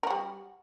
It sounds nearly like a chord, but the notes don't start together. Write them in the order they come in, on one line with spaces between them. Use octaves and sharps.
A#4 F#4 G3